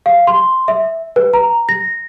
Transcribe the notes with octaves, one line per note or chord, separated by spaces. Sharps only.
F5
C6
E5
B4
A#5
A#6